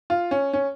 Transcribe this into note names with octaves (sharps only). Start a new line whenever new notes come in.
F4
C#4
C#4